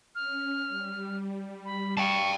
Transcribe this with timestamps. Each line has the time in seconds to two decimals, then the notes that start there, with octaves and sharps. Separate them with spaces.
0.15 C#4 F6
0.68 G3
1.65 B5
1.97 G5 A5 C#6